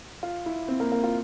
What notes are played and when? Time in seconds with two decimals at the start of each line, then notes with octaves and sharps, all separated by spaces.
0.23 F4
0.46 E4
0.68 C4
0.80 A#3
0.92 A#3
1.04 F4